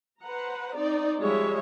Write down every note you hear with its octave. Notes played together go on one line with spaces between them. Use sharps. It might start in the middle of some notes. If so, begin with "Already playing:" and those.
B4 C5 F#5 A#5
C4 D#4 D5
F3 G3 G#3 C#5 E5